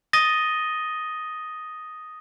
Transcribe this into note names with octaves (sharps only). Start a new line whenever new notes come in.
D#6 A6 A#6 D#7 G7